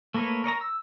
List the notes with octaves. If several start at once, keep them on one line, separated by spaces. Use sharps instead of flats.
A3 A#3 A#4 B4 C#5
A#4 C#5 D#5 A#5
E6